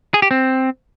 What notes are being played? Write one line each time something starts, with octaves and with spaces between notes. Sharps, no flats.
G#4
G4
C4